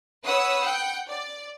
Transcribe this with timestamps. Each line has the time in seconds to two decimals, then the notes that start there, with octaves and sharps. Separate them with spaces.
0.24 B4 C#5 F#5 D#6 E6
0.62 F#5 G5
1.08 D5